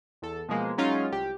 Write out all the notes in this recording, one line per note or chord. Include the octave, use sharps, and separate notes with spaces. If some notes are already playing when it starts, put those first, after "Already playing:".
E2 A4
B2 F3 G#3 A#3
F#3 G#3 C#4 D#4 F4
C2 G4